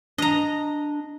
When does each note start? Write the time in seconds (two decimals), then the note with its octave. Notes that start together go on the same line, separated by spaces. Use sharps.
0.18 D4 D#5 A#5